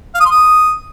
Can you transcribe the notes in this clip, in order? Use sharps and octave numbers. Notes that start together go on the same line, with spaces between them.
F5
D#6
C6
D#6